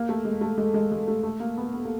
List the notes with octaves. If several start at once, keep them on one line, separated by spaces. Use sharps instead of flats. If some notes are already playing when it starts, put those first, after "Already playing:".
Already playing: A#3
A3
G#3
A3
G#3
G#3
G#3
A3
A3
A#3
B3
B3
A#3